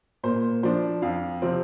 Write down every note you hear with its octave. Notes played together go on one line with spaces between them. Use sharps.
A#2 C5
F3 D4 C5
F2 F5
C3 F3 C4